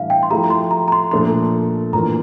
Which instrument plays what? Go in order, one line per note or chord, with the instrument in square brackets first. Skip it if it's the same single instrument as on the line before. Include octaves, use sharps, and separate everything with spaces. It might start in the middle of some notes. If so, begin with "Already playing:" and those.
Already playing: [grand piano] A2 E3 G3 D4 [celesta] E5 F5
[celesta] G5
C6
[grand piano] F3 A3 E4 G4 [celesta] A#5
[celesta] A#5
C6
A#5
A#5
C6
[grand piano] A#2 F3 A3 D4 A4 [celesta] C6
[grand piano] A2 E3 A#3 D4 F4 [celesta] A#5